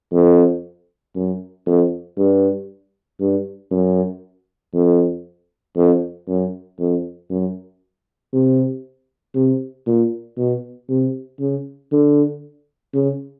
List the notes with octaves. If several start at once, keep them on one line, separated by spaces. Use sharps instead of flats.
F2
F#2
F2
G2
G2
F#2
F2
F2
F#2
F2
F#2
C3
C3
A#2
B2
C3
C#3
D3
C#3